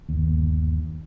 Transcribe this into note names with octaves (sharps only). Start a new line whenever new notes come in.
G1 D#2